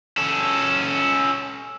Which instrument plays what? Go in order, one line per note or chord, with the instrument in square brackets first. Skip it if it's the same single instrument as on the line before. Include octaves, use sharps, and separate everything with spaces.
[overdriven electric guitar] C#4 A4